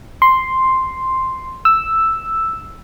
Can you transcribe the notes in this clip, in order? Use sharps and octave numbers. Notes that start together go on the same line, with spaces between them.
C6
E6